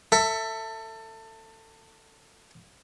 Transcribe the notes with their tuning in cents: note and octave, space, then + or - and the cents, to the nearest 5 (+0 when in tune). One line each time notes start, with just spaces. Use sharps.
A4 +25 E5 +0